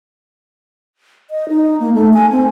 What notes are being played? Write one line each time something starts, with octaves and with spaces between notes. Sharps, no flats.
D#5
D#4
A#3
A3
G#5
C4